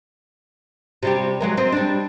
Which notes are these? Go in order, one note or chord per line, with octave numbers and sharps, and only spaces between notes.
C3 G3 G4
F#3 G#3 A#4
C4 D#5
G3 D4